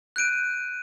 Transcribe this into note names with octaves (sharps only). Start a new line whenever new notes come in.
F#6 G6 D7 D#7